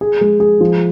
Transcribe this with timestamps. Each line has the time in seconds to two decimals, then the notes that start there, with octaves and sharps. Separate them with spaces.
0.01 G#4
0.21 G#3
0.40 G#4
0.60 F3